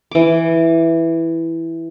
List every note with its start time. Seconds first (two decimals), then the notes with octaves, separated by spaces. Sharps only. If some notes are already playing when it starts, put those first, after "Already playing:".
0.11 E3 D6